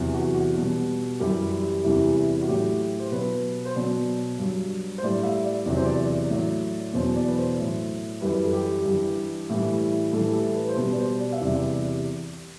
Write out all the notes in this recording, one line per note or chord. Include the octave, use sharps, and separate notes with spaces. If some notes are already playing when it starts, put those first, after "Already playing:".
Already playing: E2 C3 F#3
F#4
F#4
B2 G3
F#2 E3 G3 G4
E2 C3 E3 G3
F#4
A2 F#3 G4
C5
B2 F#3 B4
C5
B2 F#3 D5
G2 F#3
C5
A2 G3 D5
E5
D5
E2 C3 F#3 D5
C5
D5
A2 F#3
E2 B2 F#3 C5
D5
B4
C5
A2 F#3
F#2 E3 G3 B4
A4
G4
G2 E3 G3
A2 E3 G3
A2 E3 G3 A4
G4
A4
B4
C5
B2 G3 B4
D5
C5
D5
E5
E2 C3 G3 D5